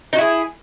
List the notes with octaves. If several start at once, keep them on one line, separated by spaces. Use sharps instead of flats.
D#4 E4 F#4 G#4